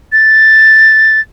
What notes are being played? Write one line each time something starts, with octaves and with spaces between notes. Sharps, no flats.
A6